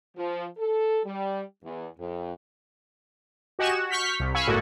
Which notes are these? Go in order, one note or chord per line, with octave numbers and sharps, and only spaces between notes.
F3
A4
G3
E2
F2
F#4 G4 D#5 G#5 F#6 E7
F#4
C#6 F6 G6 B6
C2
F5 G#5 B5 C#6 E6
G1 A2 G#3 A#3 F#4 A4